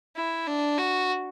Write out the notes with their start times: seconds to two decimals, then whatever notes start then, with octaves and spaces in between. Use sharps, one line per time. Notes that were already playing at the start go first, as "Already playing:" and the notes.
0.16 E4
0.47 D4
0.78 F#4